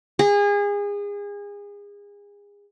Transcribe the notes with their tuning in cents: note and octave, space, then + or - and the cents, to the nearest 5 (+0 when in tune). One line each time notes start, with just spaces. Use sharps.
G#4 -30